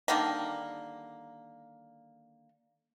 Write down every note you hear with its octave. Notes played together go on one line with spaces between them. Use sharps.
D3 D#3 G3 A#3